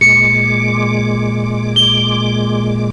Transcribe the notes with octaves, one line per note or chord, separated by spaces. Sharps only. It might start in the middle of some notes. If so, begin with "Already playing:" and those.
A#2 G#3 D6 C#7
G7